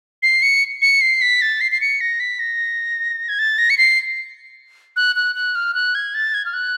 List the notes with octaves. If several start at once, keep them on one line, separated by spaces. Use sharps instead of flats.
C7
C#7
C#7
C7
B6
A6
C7
C7
C#7
A#6
B6
A#6
G#6
A6
A#6
C#7
C7
F#6
F#6
F#6
F6
F#6
G#6
A6
G#6
F6
F#6